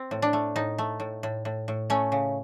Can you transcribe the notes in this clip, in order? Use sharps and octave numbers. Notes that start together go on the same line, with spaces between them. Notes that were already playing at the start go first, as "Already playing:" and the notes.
Already playing: C4
A2
D4
A3
A2 D#4
A3
A2
A2
A2
A2
A3 C#4
C#3